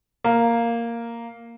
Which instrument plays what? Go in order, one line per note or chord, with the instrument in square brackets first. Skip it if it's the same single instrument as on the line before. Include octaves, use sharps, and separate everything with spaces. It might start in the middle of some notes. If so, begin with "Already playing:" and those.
[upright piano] A#3